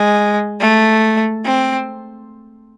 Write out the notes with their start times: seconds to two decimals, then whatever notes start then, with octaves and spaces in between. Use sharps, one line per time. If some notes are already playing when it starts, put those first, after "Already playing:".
Already playing: G#3
0.61 A3
1.45 C4